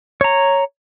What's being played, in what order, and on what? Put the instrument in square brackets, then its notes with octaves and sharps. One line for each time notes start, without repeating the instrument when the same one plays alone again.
[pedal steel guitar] C#5 A#5